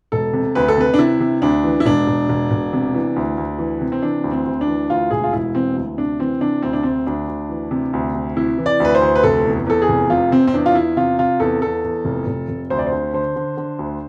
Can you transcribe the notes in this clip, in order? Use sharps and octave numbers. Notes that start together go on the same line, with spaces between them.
E1 A4
C3
D2 B4
A4
C3 B4
D4
C3 E4
C3
D2 D4
E3
E4
E1 D4
E1
E1
E1
C3
E3
D2
D2
E3
C3
C4
E3 D4
D2
C4
D2
D4
E3
D2 F4
E1 G#4
F4
E1 E4
E3 C4
D2
C3 D4
E3 C4
C3 D4
D2 C4
D4
D2 C4
D2 D4
D2
E3
C3
D2
C3
C3 E4
E3
D5
D2 B4
C5
D2
B4
F1 A4
E2
E2 A4
G#4
F1
C3 F4
C3 C4
C4
E2 D4
F4
E2 E4
C3 F4
C3 F4
E2 A4
E2 A4
E2
F1
F1
F1
D2 C5
D5
C5
D3
D3 C5
D3
D3
D2